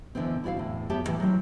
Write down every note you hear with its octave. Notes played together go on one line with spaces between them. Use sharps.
B2 D3 E3 B3 C4
E4 F#4 D5 E5 F5
E2 A2
B3 G4 C#5 E5 A5
D#2 A2 E3
F#3 G3 C4 E4